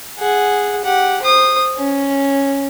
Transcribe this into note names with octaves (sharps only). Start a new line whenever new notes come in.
G#4 F#5
G4 F#5
C5 D#6
C#4